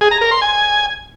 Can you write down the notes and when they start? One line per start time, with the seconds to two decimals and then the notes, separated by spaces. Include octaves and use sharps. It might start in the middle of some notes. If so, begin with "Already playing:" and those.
0.01 G#4
0.11 A#5
0.21 A#4
0.31 C6
0.41 G#5